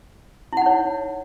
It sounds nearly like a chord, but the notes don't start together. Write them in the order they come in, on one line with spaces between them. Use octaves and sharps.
E4 F#5 D#4 C#5